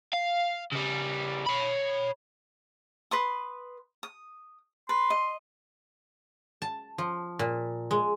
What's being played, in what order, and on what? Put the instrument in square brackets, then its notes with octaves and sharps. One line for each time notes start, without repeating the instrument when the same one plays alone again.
[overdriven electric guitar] F5
C#3 G3
C#5 B5
[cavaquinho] B4 C6 D#6
D#6
[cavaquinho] B4 [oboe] C6
[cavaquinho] D#5
[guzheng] A5
F3
A#2
G#3